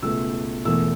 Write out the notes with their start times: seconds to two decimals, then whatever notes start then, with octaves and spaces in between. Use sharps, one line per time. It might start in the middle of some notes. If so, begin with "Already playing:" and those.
0.02 C#2 B2 A3 E6
0.65 E1 E2 E3 A3 E6